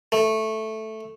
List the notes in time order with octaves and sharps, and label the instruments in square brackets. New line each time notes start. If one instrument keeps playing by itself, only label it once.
[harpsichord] A3